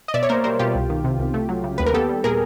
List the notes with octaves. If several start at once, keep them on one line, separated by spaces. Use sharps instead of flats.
D#5
B2 D5 E5
C#5
A#3 A#4 C5
G3 A#4 C5
B2 F4 G4
C2
D#3
C3
C2
A3
F#3
C#3
D#2 B4
A#4
B3 G4 A4
G3
A#2 G#4 A#4